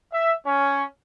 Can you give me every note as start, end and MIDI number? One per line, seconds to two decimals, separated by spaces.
0.12 0.34 76
0.45 0.83 61